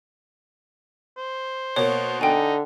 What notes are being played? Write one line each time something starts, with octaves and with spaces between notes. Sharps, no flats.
C5
B2 A#3 C#5
D3 D#4 G5 G#5